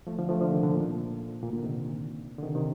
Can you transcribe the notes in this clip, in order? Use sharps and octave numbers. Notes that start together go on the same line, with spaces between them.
F3 A3
D3 F3
F3 A3
D3 F3
C3 D#3
A#2 D3
A#2
A#2
A#2 D3
C3 D#3
D3
C3 D#3
C3 D#3